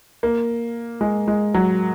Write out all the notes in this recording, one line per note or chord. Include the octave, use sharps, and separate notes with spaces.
A#3
G#3
G#3
F#3